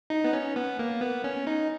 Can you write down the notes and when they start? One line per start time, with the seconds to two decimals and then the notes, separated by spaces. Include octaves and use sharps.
0.10 D#4
0.24 B3
0.33 C#4
0.56 B3
0.79 A#3
1.01 B3
1.24 C#4
1.47 D#4